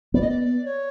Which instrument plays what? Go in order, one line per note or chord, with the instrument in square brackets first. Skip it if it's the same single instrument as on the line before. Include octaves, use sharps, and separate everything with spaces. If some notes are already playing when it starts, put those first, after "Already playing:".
[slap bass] B3 [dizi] D5
[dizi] D#5
D5
C#5